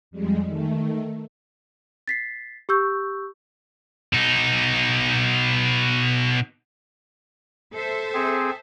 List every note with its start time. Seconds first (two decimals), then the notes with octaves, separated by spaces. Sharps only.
0.11 F2 G3 G#3
0.47 D#3 A3
2.08 A6 B6 C7
2.69 G4 C#6 E6 G6
4.13 B2 D#4
7.72 A4 C5 E5
8.14 C4 G#4